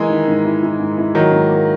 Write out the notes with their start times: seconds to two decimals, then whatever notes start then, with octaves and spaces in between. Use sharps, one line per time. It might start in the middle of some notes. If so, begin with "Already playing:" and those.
Already playing: E3 G#3 A#3 E4
0.10 D#3
0.28 G#2
0.45 E4
0.63 E4
0.80 G#2
0.98 E4
1.15 D#3 F#3 A#3
1.32 G#2
1.49 A#3